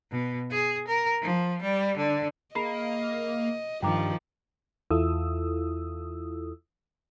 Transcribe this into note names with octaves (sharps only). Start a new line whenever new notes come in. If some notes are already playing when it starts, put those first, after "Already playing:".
B2
G#4
A#4
F3
G3
D3
A#3 G#4 D#5 B5 C7
G2 D#3 F3 G5 A#5 D6
E2 E4 F4 A4 D#6 E6